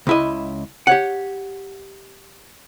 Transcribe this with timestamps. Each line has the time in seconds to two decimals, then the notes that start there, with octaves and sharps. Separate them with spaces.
0.07 C#2 E4 D#5
0.87 G4 C#5 F#5